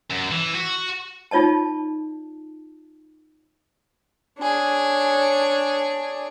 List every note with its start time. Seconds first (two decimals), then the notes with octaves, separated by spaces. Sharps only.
0.10 F#2
0.31 E3
0.55 F#4
1.31 D#4 F4 C#5 D#5 A5
4.40 D4 G#4 C#5